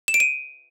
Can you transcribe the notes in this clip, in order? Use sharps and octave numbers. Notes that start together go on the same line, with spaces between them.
E7
D7
D#7